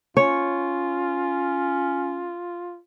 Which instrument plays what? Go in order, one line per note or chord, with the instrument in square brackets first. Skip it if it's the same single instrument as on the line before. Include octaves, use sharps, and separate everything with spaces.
[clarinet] C#4 [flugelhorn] F4 [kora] C#5